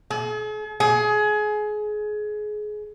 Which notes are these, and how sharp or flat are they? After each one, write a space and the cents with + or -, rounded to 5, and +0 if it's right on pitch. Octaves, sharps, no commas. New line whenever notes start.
G#4 +45
G#4 +25